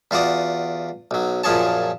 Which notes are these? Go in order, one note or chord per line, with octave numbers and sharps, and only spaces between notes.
E2 F4 F#4 D5 D#6
B1 F#3
F#2 A#2 F3 G#4 C#5 A5